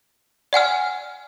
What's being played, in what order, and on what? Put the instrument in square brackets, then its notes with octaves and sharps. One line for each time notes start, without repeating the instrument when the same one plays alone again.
[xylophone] D5 F#5 G#5 F6